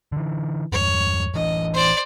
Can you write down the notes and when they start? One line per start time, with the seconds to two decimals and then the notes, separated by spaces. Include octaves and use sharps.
0.12 D3 E3
0.72 E2 G2 C#5
1.34 A1 E3 D4 D#5
1.74 C5 D5